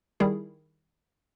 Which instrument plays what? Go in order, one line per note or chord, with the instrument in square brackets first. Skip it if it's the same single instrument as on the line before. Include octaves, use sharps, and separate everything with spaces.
[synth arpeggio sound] D#3 G3 E4 G#4